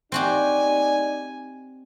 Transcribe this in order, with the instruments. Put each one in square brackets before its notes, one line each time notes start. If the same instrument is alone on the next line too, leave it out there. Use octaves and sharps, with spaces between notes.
[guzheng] C4 F#4 G4 [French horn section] D#4 D5 [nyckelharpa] G#5